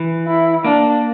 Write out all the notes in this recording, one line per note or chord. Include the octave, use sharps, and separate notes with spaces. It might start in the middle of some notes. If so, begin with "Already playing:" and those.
Already playing: E3
E4
A#3 D4